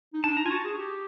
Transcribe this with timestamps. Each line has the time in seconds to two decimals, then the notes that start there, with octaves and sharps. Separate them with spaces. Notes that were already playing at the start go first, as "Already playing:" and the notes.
0.14 D#4
0.24 D4 A5
0.37 D#4 A#5
0.45 F4 G#5
0.50 F#4 A5
0.64 G#4
0.78 G4